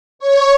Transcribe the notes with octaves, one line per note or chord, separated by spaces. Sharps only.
C#5